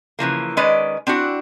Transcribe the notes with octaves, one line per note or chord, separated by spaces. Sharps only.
C#3 E3 F3 A#3
D#3 G#3 C#4 B4 D5 D#5
C4 D4 E4 F#4